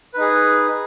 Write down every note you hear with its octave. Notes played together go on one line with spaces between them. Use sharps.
D#4 G#4 B4